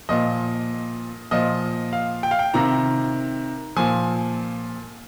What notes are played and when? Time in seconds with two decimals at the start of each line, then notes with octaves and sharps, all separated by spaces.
0.09 A#2 F3 D#5
1.31 A#2 F3 D#5
1.93 F5
2.23 G5
2.31 F5
2.39 G5
2.54 C3 D#3 A#5
3.77 A#2 F3 G#5